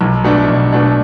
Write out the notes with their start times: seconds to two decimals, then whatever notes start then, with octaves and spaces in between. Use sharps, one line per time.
0.01 B1
0.24 B2 A3 D4
0.49 B1
0.72 B2 A3 D4